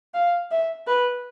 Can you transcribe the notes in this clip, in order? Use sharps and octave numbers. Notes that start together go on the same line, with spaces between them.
F5
E5
B4